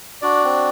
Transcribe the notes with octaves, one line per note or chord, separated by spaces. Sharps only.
D4 F#4 D5
C4